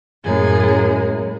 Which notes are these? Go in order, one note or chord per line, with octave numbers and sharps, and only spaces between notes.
F#2 A2 G#3 A#3 G#4